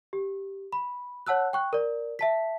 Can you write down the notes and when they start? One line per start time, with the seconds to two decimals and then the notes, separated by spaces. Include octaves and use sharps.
0.13 G4
0.73 B5
1.27 C#5 F#5 A5 E6 F#6
1.53 G5 C#6 F#6
1.73 A#4 D5
2.19 E5 A5 B6